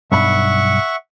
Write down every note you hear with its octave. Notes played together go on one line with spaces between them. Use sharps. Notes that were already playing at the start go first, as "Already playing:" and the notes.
B1 G2 E5 F#5 B5 C#6